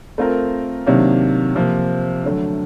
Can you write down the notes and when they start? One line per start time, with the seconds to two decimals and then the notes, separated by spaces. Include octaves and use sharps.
0.18 A3 C4 F4 A#4
0.86 C3 D#3 F#3 A#3 D4
1.55 C3 F3 A#3
2.24 D3 F#3 A3